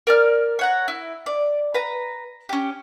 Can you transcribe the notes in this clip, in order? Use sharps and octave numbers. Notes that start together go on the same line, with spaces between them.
A#4 D5 F6
C#5 F#5 A#5
E4
D5
B4 A#5
C#4 G4